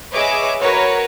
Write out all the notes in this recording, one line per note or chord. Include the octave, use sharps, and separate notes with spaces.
G#4 B4 C#5 D#5 E5 D6
F#4 A#4 B4 C#5